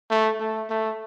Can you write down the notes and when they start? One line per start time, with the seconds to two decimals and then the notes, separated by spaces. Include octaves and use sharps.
0.11 A3
0.40 A3
0.70 A3